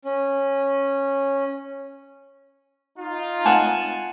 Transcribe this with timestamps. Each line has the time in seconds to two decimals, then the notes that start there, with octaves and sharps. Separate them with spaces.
0.05 C#4
2.97 D#4 F4
3.45 F#5 G#5 A5